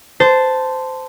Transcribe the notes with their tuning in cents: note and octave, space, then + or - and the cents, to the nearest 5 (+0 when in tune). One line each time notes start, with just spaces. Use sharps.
C5 -15 A5 +0